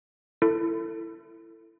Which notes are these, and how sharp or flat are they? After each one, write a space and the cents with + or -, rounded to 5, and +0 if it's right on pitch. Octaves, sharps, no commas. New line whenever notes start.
E4 +15 A4 +20